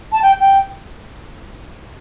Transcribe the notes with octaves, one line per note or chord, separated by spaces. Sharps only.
A5
G5
G5